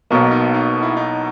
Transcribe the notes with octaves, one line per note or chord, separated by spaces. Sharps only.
B1 B2 A#3 B3
D#4
D#4
E4
D#4